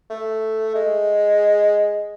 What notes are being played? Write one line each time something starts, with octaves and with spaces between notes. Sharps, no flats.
A3
G#3